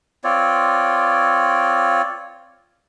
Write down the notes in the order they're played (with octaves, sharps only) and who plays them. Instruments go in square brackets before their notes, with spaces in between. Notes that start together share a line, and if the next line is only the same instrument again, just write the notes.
[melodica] C4 F4 C#5 D5